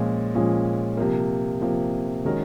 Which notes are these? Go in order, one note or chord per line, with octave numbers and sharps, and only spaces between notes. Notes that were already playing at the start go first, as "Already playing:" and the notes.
Already playing: A#2 F3 G#3 C#4
A#2 F3 G#3 C#4
C3 F3 A#3
C3 F3 A#3
D#3 G#3 C#4 F#4 A#4